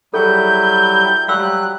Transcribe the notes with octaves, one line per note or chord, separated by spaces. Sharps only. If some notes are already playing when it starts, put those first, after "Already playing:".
F#3 G3 E4 G#4 A4 G6
F#3 G3 F5 B5 E6 F#6